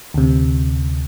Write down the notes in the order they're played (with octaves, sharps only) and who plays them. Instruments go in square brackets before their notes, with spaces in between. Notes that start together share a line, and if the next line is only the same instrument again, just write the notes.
[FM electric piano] D2 C3